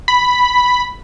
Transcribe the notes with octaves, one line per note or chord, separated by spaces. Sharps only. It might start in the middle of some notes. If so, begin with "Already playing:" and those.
B5